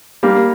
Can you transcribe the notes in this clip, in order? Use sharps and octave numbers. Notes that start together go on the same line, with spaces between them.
G3 A#3